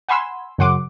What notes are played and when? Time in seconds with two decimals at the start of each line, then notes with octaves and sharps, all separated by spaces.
0.08 F#5 G#5 B5 C6 E6
0.58 F#2 C#3 F#5 C6 D6